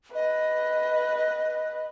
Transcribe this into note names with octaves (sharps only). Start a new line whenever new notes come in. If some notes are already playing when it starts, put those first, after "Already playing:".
B4 D#5